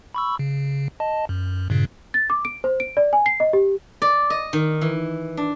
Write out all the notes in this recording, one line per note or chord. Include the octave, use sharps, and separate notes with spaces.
B5 C#6 E6
C#3
D#5 A5
F#2
G2 A#2 C#3
A6
D6
D7
C5
D7
D5
G#5
C7
D#5
G4
D5
D#5
D#3
E3
D4